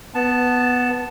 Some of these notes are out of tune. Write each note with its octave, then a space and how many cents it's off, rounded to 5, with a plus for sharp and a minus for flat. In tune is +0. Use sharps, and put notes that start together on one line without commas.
B3 +0 A5 +0